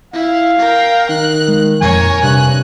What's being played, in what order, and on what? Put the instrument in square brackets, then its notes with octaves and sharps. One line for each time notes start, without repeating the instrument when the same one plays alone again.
[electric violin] E4 [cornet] F5
[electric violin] A#4 G5
[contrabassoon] D#3 [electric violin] F#6
[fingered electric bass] G#3
[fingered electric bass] F2 A#2 F3 [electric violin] A#4 C#5 [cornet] G#5
[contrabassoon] G2 [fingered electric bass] C3 [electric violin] F#6